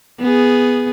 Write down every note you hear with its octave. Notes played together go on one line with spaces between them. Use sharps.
B3 G#4